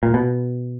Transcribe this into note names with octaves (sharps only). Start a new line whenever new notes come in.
A#2
B2